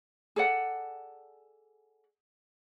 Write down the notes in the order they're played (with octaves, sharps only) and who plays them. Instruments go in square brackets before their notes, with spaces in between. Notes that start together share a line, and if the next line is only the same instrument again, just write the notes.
[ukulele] G#4 A4 D5 F#5